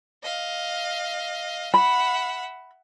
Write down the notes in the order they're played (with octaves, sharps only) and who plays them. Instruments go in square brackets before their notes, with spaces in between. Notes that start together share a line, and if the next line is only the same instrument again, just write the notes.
[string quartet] D#5 F5
[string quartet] E5 F#5 [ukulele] B5